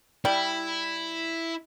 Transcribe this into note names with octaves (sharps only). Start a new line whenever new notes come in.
G3 E4